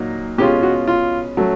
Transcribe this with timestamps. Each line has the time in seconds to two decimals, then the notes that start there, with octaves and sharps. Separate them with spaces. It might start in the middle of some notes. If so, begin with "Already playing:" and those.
Already playing: A#2 F#3 A#3 D#4
0.38 B2 G#3 C#4 F4 G4
0.63 F#4
0.87 F4
1.37 F#3 A3 C#4